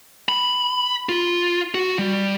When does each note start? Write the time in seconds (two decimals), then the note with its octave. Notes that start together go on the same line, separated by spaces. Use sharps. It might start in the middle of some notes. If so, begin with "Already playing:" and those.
0.29 B5
1.09 F4
1.74 F#4
1.99 G3